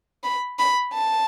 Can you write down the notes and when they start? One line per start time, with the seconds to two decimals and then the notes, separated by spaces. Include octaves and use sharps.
0.23 B5
0.59 B5
0.93 A5